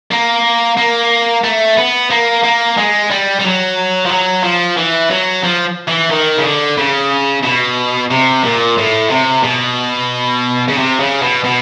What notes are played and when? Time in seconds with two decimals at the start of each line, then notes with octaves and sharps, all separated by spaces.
0.11 A#3
0.78 A#3
1.44 A3
1.77 B3
2.11 A#3
2.44 A#3
2.77 G#3
3.10 G3
3.39 G3
3.44 F#3
4.06 F3
4.11 F#3
4.44 F3
4.77 E3
5.10 F#3
5.44 F3
5.88 E3
6.11 D#3
6.38 C#3
6.44 D3
6.78 C#3
7.44 B2
8.11 C3
8.44 A#2
8.78 A2
9.10 C3
9.44 B2
10.68 C#3
10.77 C3
11.00 C#3
11.22 B2
11.44 B2